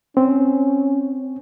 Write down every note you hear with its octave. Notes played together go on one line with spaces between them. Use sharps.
C4 C#4